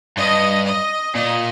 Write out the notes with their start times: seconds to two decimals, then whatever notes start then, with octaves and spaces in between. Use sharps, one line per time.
0.18 G2 D#5
0.66 D#5
1.15 A#2 D#5